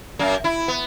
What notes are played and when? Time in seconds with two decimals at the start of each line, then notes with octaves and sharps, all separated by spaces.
0.19 F#2 A#3
0.44 E4
0.68 B3